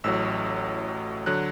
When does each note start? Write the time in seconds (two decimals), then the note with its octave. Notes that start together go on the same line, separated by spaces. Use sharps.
0.04 A1 A2 F#3 E6
1.26 D3 F#3 F#6